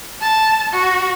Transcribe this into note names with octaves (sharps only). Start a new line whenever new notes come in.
A5
F#4